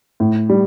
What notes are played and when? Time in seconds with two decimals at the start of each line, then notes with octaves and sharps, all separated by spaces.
0.20 A2
0.49 G3